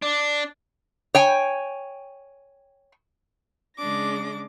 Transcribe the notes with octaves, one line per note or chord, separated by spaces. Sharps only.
D4
C#5 G5 G#5
C#3 G#3 D4 D6 A#6